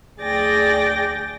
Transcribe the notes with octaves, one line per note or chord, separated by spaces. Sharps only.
D2 G#4 D5 G5 A6 A#6